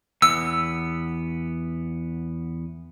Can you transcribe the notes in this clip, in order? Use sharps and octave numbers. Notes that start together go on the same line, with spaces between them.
E2 B3 E6